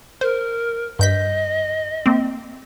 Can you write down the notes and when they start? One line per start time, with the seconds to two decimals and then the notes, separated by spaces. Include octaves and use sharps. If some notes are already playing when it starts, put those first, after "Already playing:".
0.21 A#4 C5
0.99 G2 D#5 G6 B6
2.06 A#3 C4